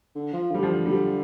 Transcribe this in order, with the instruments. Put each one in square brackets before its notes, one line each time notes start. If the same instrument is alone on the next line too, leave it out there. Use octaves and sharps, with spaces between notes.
[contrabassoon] D3
F3
[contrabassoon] D3 [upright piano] G3
[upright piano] F3
[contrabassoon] D3
[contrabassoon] D3 [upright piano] G3